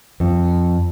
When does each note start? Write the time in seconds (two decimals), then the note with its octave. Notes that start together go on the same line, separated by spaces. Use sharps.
0.20 F2